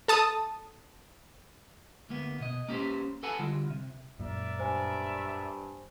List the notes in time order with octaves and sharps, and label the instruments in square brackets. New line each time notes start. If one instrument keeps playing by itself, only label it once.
[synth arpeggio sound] A4 A5 D#6
[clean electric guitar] D2 A#3 B3
B2 D#5
A#3 C#4 G4 G#4 B4 C5
A4 B4 F#5 G#5 A5 B5
D3 G3 F4 F#4
C3
[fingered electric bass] F#2 A#2 [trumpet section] A#4 D5 E5
[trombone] G2 [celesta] C5 G#5